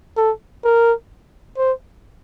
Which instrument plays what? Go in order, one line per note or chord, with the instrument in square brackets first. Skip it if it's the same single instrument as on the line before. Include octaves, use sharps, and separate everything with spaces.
[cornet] A4
A#4
C5